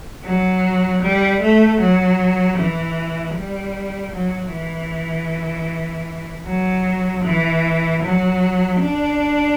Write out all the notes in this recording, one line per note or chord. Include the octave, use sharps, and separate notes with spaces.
F#3
G3
A3
F#3
E3
G3
F#3
E3
F#3
E3
F#3
D4